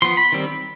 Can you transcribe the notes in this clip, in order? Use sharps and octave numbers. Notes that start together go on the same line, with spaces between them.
F3 B3 C6
B5
D#3 G3 C4